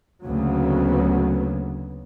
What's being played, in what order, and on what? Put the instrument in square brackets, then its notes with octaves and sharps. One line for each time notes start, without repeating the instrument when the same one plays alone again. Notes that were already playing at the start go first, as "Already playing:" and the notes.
[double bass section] D2 C#3 F#3 A#3 B3